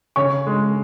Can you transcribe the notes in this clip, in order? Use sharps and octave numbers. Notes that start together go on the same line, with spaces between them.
C#3 C#5 C#6
G#3